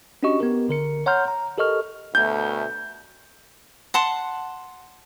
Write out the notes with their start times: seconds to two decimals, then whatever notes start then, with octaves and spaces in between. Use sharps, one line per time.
0.23 C#4 D4 F#4 G4 D#5 C#6
0.40 B3 G4 A#4
0.68 A#1 D3 A#4 C#7
1.06 C#5 F#5 A#5 C6 F6 G6
1.28 A#5
1.58 G4 A4 A#4 D#5 C#6 F6
2.15 D2 B2 A3 G6
3.94 F#5 A5 C6